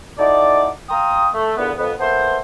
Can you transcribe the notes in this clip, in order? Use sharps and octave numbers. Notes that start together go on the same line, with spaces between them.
D#4 E4 F#4 A4 D5
F5 G5 A#5 C6 D#6
A3
E2 A#2 D3 E3 B3
F2 B3
A#3 B3 E4 A4 C5